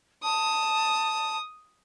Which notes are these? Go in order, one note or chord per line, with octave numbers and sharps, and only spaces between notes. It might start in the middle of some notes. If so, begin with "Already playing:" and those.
A5 D#6